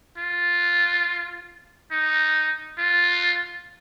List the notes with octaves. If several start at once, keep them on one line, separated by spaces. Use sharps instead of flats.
F4
D#4
F4